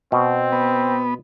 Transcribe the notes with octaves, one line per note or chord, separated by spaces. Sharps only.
B2 C4
B3